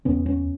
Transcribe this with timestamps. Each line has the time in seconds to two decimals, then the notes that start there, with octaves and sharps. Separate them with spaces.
0.05 E2 C#3 B3 C#4
0.26 B3 C#4